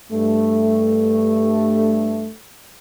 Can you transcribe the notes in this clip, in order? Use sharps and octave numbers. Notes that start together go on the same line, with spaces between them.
G2 A3